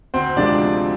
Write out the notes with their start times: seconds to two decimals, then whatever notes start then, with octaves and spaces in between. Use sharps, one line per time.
0.14 D2 C4 C5
0.37 C3 F3 G#3 D4 D5